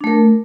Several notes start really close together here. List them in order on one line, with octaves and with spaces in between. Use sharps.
D4 A3 A#4